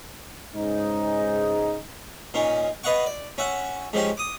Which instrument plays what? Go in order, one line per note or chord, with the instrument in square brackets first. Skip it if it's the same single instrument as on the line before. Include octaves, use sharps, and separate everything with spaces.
[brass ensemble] G#2 C#3 G#3 D#4
[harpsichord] A#2 C#4 D#4
B4 D#5 F5 F#5 C#6
D5
C#4 E5 F#5
G#2 F3 C#4 G4
D6 D#6